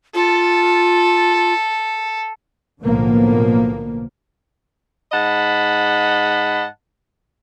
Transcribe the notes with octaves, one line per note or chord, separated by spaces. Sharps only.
F4 A4
B1 A2 D3 F3 A#3 B3
G#2 D#5 F#5 A5 B5